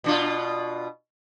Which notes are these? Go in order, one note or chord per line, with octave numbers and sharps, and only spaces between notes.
B2 D4 F4